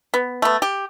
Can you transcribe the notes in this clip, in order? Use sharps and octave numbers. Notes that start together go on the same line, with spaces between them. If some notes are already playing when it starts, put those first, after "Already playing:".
B3
A3 B3
G4